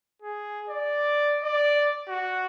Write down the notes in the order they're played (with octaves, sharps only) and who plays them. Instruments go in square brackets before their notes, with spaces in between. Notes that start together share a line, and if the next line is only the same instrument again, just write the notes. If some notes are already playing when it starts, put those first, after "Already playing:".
[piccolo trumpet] G#4
D5
D5
F#4